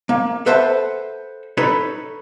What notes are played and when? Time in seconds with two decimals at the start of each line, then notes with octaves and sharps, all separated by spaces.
0.09 A#3
0.46 A4 B4 C5 E5 F#5 A5
1.57 D#4 A4 B4 C#5